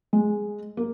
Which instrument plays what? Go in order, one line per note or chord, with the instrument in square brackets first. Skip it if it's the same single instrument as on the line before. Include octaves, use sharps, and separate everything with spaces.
[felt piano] G#3
A#3